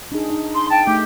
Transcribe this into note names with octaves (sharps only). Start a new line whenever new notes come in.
D4 D#4 G#4
D#4
C6
G5 A5
A3 D#4 G4